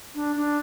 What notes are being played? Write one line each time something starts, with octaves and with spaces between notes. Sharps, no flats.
D4
D4